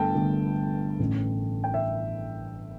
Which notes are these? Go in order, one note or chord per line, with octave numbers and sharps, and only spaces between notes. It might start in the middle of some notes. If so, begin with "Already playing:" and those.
Already playing: G1 G2 D3 A3 G5 A5
G1 G2 D3 A3
A1 A2 E3 A3
G5
E5